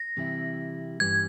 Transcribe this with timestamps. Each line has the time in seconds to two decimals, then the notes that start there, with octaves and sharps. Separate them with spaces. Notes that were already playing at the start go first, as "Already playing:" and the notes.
Already playing: A#6
0.17 C3 E3 G3 C4 E4
1.00 G2 E3 G3 C#4 G#6